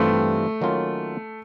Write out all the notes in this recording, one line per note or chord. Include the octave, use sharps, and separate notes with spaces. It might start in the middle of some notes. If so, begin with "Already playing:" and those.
Already playing: G2 E3 G3 A3 C4 F4
D#3 F#3 A#3 C#4 F4